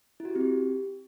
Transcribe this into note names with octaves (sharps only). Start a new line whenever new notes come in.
E4
F#4
G4
C4
G4